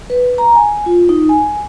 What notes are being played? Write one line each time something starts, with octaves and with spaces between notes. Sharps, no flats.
B4
A#5
G#5
F4
D#4
G#5